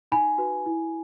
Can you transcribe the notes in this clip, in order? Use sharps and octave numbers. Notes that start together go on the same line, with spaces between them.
D#4 G#5 B5
F#4 B4
E4